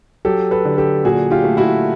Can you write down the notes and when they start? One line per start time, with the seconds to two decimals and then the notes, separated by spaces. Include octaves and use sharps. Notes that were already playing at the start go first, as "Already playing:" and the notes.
0.25 F#3 G4 A4
0.51 A4 B4
0.65 D3
0.78 G4 A4
1.05 A#2 F#4 G#4
1.31 F4 G4
1.44 A3
1.57 E4 F#4